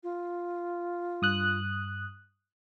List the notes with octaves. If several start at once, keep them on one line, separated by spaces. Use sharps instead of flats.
F4
G2 D#6 F#6